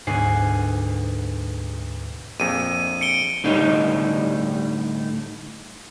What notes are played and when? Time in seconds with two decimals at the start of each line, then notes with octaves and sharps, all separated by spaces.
0.07 D2 G#2 B2 F#5 G#5 C7
2.40 A#1 F2 D#7
3.01 C#7 D7 G7
3.44 A2 D3 G3 D#4 C#5